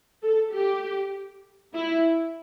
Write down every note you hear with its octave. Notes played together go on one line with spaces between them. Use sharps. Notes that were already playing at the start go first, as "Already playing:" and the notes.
A4
G4
E4